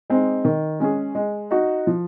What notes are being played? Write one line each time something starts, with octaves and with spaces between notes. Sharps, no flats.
G#3 C4 D#4
D#3
G#3 C#4 G#4
G#3
D#4 F#4
F3